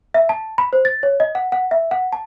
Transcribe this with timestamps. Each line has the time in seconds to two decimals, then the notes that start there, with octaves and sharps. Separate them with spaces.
0.14 E5
0.29 A5
0.58 B5
0.73 C5
0.85 A6
1.03 C#5
1.20 D#5
1.35 F#5
1.52 F#5
1.71 E5
1.91 F#5
2.13 A5